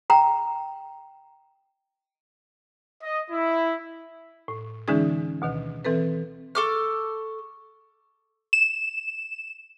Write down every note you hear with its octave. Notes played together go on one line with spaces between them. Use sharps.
G5 A#5
D#5
E4
A2
D3 E3 G#3 C#4 D#4 G#4
D2 B2 D#3
E3 C4 A4 B4
A4 C#6 D6 F6
E7